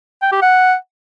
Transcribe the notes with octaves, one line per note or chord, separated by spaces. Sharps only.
G5
G4
F#5